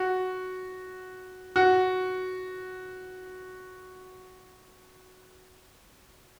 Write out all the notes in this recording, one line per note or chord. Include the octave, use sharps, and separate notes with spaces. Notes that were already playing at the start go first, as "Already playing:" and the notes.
Already playing: F#4
F#4